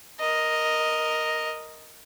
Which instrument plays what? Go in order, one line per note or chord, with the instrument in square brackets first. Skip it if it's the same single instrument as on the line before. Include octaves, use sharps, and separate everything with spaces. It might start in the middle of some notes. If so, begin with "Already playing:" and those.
[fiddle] A#4 D#5